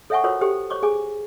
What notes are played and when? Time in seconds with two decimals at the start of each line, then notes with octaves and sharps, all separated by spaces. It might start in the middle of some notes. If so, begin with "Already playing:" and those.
0.10 A4 C#5 E5 F#5 G#5 C#6
0.24 F4 F#4 A4 A#4 C5 C#5
0.41 G4 A4 C5 G5
0.70 C5 C#5 C#6 D6
0.83 G#4 G#5 D6